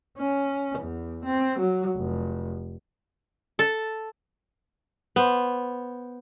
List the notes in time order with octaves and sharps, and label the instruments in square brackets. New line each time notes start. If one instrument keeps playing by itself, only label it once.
[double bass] C#4
E2
C4
F#3
F1
[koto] A4
[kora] B3 C5